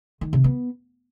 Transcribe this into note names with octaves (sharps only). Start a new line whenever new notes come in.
D#3
C3
B3